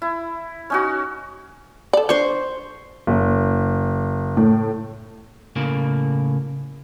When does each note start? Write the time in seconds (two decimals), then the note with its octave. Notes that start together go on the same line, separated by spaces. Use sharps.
0.02 E4
0.70 C#4 D#4 F#4
1.93 A4 D5
2.09 D4 C5 C#6
3.07 F#1
4.37 A2
5.56 A2 C#3 A#3